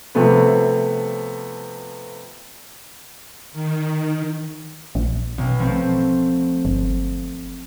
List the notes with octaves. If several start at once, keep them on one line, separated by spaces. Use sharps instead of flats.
C3 F3 A3 B3
D#3
A#1
B1 B2
F3 A3 C4
G1